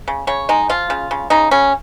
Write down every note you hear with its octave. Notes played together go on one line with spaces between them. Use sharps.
C#3
C#3 C#5
G#3 D#4
F3 F4
C#3
C#3
C#3 D#4
C#3 C#4